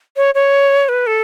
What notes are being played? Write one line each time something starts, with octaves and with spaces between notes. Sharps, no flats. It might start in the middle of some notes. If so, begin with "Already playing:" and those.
C#5
C#5
B4
A4